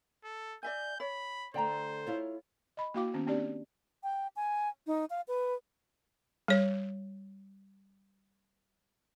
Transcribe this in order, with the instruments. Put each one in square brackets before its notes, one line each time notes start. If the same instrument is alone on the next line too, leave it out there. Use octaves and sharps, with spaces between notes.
[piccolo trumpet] A4
[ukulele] D5 E5 G#5 [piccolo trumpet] G6
[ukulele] C#5 [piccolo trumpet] B5
[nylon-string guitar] D3 A3 [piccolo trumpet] C5 [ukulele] D5 G5 A#5
[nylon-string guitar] E4 F4 C#5
[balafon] D#5 B5
A#3 E4 F#4 F5 G5 D6
D#3 A#3 B3 C#4
A#3 C4 D4 G4 D5
[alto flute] G5
G#5
D#4
F5
B4
[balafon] G3 C#5